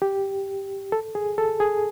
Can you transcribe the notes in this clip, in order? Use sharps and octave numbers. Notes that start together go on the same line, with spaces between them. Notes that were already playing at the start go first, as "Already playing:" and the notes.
G4
A4
G#4
A4
G#4